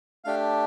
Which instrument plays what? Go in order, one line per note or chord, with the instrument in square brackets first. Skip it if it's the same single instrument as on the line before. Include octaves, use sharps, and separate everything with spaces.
[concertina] A3 D4 G4 F5